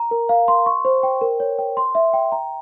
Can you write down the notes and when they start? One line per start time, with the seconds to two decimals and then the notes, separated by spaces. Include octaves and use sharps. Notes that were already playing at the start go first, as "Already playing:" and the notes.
Already playing: A#5
0.11 A#4
0.29 F5
0.48 C6
0.66 C#6
0.85 C5
1.03 G5
1.21 A#4
1.40 C#5
1.59 G5
1.77 C6
1.95 E5
2.13 G5
2.32 A#5